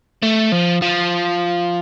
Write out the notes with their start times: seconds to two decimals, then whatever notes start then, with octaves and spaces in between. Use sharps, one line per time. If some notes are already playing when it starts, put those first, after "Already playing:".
0.22 A3
0.52 F3
0.82 F3